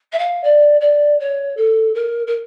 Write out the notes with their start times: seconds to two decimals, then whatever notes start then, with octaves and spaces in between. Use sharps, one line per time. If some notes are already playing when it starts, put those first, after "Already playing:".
0.12 E5
0.18 F5
0.43 D5
0.80 D5
1.19 C#5
1.57 A4
1.94 A#4
2.27 A#4